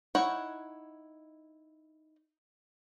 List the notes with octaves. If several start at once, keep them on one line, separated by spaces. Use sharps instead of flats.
D#4 E4 C#5 F#5